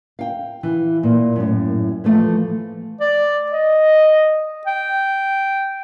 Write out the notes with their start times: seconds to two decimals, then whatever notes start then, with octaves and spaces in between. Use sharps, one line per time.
0.19 F5 G5
0.63 E3
1.03 A#2
1.36 F#2 A2
2.04 E3 F3 A3
3.00 D5
3.52 D#5
4.67 G5